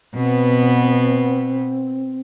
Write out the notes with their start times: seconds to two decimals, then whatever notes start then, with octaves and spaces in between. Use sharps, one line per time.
0.14 B2 B3 C4